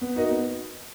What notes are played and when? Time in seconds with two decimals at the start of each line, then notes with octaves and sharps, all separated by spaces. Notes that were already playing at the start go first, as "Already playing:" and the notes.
0.01 B3
0.16 D#4 F#4 A#4 D#5
0.31 B3